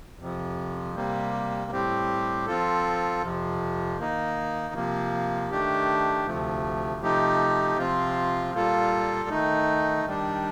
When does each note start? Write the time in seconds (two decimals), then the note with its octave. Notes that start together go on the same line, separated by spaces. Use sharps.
0.19 F2 C3 F3
0.95 C3 G3 A#3
1.71 A2 G3 C4 G4
2.46 F3 C4 F4 A4
3.22 F2 C3 F3
3.98 D#3 A#3 D#4
4.74 C3 F3 A#3
5.51 D#3 A3 D4 G4
6.26 D2 C3 F3 A3
7.02 C3 F3 A3 D#4 G4
7.78 C3 F3 C4 F4
8.54 A#2 G3 A#3 F4 A4
9.30 D#3 A3 D#4
10.05 D#3 G3 D4